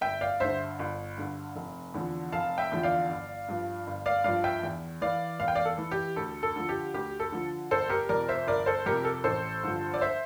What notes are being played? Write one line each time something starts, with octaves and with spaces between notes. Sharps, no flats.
G1 E5 G5
D5 F5
G2 D3 C5 E5
G1
G2 D3
F1
E2 D3 F3
F1 F5 A5
E5 G5
E2 D3 F3
D5 F5
G1
G2 F3
G1
D5 F5
G2 F3 D5 F5
E5 G5
E2
E3 D5 F5
E2 F5
G5
D5 F5
A4
E3
G4
D2 A4
A4
D3 F3
G4
D2 G4
A4
D3 F3
G1 A4 C5
G4 A#4
F2 C3 A#4 D5
C5 E5
G1 A#4 D5
A4 C5
F2 C3 G4 A#4
A4
A1 A4 C5
G2 D3 F3
D5
C5 E5